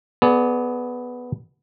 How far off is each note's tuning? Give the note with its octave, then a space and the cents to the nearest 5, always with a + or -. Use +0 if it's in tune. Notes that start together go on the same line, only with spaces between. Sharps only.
B3 +0 G#4 +35 D5 +0